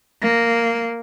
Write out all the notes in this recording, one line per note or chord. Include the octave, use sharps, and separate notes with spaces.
A#3